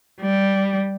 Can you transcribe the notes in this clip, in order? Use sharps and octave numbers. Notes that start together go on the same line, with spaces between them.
G3